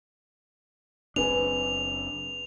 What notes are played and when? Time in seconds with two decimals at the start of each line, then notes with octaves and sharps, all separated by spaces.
1.16 F#1 C4 D4 G#4 B4 G#5 F7